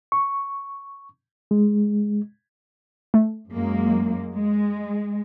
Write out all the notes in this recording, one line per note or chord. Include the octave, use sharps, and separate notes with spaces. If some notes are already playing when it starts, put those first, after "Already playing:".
C#6
G#3
A3
F#2 G#3 A#3
G#3